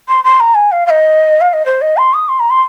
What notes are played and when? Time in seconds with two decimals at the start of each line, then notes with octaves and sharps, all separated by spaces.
0.08 C6
0.24 C6
0.40 A#5
0.55 G#5
0.72 F5
0.86 F5
0.90 D#5
1.41 F5
1.53 D#5
1.66 C5
1.81 D#5
1.97 C6
2.14 D#6
2.28 C6
2.40 A#5
2.50 C6